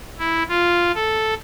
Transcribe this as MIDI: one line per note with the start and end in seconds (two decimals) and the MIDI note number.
0.18 0.43 64
0.49 0.92 65
0.94 1.34 69